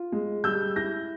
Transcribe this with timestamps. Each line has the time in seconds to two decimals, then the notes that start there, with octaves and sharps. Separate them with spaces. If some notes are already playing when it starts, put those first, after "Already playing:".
Already playing: F4
0.12 G#3
0.44 G3 E6 G6
0.76 E4 G6 A#6